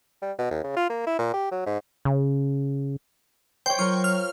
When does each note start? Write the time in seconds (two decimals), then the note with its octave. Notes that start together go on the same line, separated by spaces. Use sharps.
0.22 G3
0.38 B2
0.51 D#2
0.64 C#3
0.77 F4
0.90 A#3
1.07 E4
1.19 A#2
1.34 G4
1.51 F#3
1.66 G#2
2.05 C#3
3.66 C5 C#5 G5
3.79 F#3 F4 A#4 C#6
4.04 F6